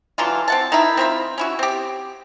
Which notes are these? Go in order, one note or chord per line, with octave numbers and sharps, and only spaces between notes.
D3 E3 F#3 F4
C4 F#5 A5
D#3 D#4 E4
C4 F4 B5
C#4 E4 F#4
C4 G4